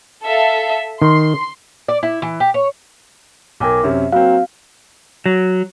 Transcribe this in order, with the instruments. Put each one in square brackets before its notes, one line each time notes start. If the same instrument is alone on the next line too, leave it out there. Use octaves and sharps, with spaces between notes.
[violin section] A4 E5 F5
[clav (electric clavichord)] D#3 [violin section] C6
[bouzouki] D5
E4
E3
G4
C#5
[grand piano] B1 G5 G#5 [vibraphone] A#4 D6
[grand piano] F#2 C3 C#4 [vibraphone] E5
[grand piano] F#3 A#3 C4 [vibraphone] F#4 [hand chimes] F5
[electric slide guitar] F#3